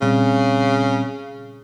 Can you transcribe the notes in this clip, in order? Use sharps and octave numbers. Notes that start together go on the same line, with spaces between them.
A#2 C#3 G3 C4